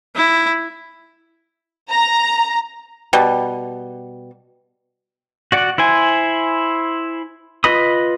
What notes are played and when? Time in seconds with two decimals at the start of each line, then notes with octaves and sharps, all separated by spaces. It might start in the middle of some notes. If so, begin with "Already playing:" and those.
0.16 E4
1.90 A#5
3.13 B2 G3
5.52 F#4 D5 F#5
5.78 E4 C5 G#5
7.64 F4 B4 D#5 B5 D#6